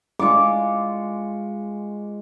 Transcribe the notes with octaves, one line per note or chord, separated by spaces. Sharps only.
G#3 F4 C#6 D6